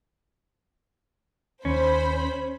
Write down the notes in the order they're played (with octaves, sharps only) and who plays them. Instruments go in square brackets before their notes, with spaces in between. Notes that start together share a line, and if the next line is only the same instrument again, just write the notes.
[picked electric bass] D#2 [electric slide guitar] C#4 [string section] C5 B5